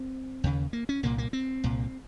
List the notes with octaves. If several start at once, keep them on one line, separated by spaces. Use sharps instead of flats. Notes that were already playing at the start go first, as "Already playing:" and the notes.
Already playing: C4
D#2 C#3
A#3
C#4
C2 A#2 A#3
A#3
C4
C2 A#2